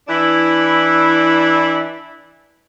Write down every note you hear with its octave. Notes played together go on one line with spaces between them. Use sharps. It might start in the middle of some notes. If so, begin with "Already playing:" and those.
E3 D4 E4